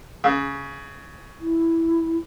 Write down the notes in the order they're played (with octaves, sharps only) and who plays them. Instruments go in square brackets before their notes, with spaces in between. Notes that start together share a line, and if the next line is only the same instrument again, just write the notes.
[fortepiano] C#3
[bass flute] E4